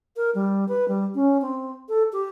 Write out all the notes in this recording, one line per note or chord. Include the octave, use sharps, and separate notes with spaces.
A#4
G3
B4
G3
C#4
C4
A4
G4